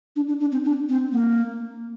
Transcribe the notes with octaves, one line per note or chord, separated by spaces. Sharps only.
D4
D4
D4
C4
D4
C4
A#3